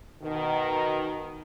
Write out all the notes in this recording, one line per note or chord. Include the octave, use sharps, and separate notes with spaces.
B2 D#3